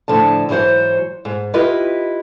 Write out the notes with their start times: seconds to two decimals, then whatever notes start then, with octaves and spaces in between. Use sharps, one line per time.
0.08 A2 D3 F3 A5
0.49 G#2 E3 F#3 C5 C#5
1.25 G#2
1.54 E4 F4 G4 B4 D#5